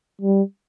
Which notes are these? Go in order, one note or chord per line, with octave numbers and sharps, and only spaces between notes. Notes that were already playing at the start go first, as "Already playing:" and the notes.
G3